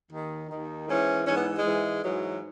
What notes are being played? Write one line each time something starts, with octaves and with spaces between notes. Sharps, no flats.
D#2 D#3
D#2 D#3
G#2 E3 C#4
G#2 E3 B3 C#4
G#3
G#2 E3
G#2 E3 F#3